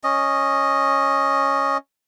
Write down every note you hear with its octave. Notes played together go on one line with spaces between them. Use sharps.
C#4 D#5